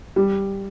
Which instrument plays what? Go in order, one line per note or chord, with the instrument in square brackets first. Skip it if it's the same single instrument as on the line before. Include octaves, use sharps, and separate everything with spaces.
[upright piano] G3